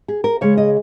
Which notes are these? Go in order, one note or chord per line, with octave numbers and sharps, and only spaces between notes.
G#4
A#4
C#3 G#3 C#5
D#5